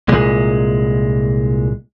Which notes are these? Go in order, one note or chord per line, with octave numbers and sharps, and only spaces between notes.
C2 A#2 G#3